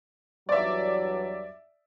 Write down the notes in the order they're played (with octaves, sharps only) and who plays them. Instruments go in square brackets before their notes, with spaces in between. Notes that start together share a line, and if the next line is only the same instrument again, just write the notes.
[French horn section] E2 G2 F#3 [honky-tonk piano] D5 E5